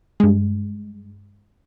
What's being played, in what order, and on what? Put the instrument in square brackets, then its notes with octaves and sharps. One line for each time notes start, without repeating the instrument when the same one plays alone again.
[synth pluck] G2 G#3